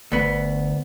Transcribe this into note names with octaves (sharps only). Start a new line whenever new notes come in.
G1 D2 B3